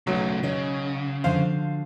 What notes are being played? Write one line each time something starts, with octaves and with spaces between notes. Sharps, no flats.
B1 C#3 F#3 A3
C#3 C#5 D#5
D3 F3 F#4 C5 F5